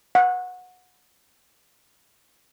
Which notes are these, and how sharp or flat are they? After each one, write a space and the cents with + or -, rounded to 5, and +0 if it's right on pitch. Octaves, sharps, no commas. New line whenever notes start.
F#5 -25